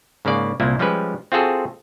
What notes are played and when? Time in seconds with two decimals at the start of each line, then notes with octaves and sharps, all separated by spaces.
0.25 G#2 C#3 A#3 D5
0.60 C2 A#2 A#3 E4
0.79 F3 G3 G#3 C#4 B4
1.32 C4 F4 F#4 G#4 A4